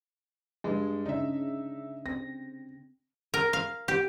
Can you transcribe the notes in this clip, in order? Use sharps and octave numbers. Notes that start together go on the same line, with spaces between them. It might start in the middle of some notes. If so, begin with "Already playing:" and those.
G2 G#3
C#3 D4 D#4 E5
C4 A#6
A#4
F5
G4